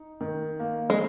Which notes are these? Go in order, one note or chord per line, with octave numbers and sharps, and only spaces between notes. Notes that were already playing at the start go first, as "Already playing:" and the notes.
Already playing: D#4
D#3
A#3
G#3